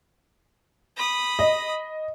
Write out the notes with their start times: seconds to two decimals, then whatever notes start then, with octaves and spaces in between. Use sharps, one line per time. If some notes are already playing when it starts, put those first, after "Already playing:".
0.96 B5 D#6
1.39 D#5